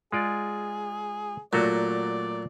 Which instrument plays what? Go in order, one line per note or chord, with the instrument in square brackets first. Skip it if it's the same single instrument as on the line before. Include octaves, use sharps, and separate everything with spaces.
[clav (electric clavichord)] G#3 F4 D5 [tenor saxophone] G#4
[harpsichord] A#2 [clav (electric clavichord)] F#3 A3 F#4 [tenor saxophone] D5